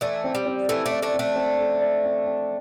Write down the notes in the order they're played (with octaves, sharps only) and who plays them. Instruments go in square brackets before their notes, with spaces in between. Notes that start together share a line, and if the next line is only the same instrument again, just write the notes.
[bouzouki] E3 A3 [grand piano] D5
[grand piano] C4
[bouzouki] G3
[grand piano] C4
[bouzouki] E3 A3 [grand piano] A4
[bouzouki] A3 D4 [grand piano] D5
[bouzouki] A3 D4
[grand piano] C4
[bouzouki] A3 D4
[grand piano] C4
A4
D5
C4
C4